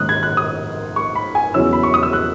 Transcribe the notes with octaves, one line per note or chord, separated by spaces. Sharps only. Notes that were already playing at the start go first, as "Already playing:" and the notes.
Already playing: G#2 D#3 A#3 C#4 D#6 F#6
G#6
F#6
D#6
C#6
B5
G#5
E2 C#3 F#3 C#4 E4 E6
B5
C#6
D#6
E6
F#6